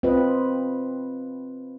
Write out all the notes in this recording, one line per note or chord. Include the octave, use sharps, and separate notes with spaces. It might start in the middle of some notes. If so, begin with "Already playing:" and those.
C4 F4 B4 D#5